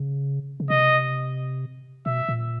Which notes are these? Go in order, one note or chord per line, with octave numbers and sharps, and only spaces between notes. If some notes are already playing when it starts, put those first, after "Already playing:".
Already playing: C#3
C#3
C3 D#5
B2 E5
A#2